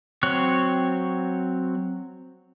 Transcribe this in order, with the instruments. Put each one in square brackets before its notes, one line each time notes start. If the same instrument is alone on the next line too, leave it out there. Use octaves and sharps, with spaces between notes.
[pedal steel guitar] F#3 C4 C#5 F#6